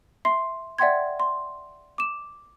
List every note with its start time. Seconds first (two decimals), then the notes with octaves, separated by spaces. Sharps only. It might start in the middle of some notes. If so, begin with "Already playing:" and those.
0.25 E5 C6 C7
0.79 D5 E5 F#5 G5 C6 G#6
1.20 C6
1.98 D6 E7